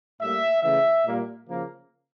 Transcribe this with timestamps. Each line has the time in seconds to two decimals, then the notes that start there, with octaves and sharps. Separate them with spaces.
0.21 A2 G3 A#3 E5
0.63 C#3 E3 A3 E5
1.05 A#2 G3 A#3
1.48 C#3 F3 A#3